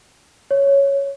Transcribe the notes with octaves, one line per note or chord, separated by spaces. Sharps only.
C#5